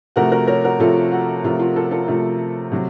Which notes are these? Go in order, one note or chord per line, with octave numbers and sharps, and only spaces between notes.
C3 F3 A3 F#4 A#4
F#4 A#4
A#4 C#5
F#4 A#4
C3 F3 A3 F4 A4
F#4
C3 F3 A3 F4
F4
F4 A4
F4 A4
C3 F3 A3 F4
C3 F#3